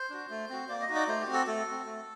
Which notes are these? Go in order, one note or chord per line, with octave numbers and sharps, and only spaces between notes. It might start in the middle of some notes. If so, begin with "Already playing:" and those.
Already playing: C5
D4 F#4
A3
C4 F#4
A#3 D5
D#5
D#4 F#4
D5
A3 C5
G4
C4 F#4
A4
A3 A4
C4 F#4
A3